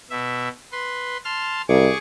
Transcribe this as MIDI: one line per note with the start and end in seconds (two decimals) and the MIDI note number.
0.10 0.48 47
0.10 0.48 76
0.72 1.17 71
0.72 1.17 84
1.25 1.62 81
1.25 1.62 84
1.25 1.62 89
1.69 1.89 36
1.69 1.98 68
1.69 1.98 85
1.69 1.98 86